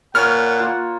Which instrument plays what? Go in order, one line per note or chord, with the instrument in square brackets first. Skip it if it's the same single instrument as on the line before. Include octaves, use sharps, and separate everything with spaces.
[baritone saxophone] A#2 [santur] B4 C#5 [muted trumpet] F#5 [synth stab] F6
[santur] A#3 F4